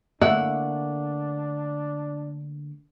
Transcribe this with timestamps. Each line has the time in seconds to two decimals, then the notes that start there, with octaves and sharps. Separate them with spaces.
0.21 D3 A3 A#3 D4 E4 F#5